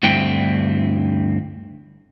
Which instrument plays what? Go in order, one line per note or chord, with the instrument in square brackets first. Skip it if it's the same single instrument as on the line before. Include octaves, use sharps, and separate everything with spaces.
[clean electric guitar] D2 G2 C4 E4 G5